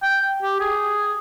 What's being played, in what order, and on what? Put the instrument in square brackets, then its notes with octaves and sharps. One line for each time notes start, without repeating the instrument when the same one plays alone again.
[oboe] G5
G4
G#4